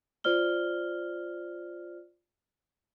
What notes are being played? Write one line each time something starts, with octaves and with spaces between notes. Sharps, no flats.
F4 C5 D5 F6 G7